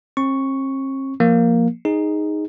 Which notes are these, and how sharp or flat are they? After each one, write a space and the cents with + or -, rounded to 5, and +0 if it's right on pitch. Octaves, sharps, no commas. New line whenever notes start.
C4 +45 C#6 +0
F3 +0 A#3 +0
D#4 +0 G#4 -10